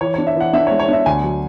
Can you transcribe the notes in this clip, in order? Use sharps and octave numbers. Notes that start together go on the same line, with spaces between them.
E3 C#5
D4 C#5
E5
E3 F#5
D4 E5
C#5
G#3
C#5
D4 E5
D2 G#5
F#3